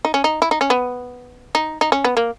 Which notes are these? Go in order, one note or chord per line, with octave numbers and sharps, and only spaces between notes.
D#4
C#4
D#4
E4
D#4
C#4
B3
D#4
D#4
C#4
B3
A#3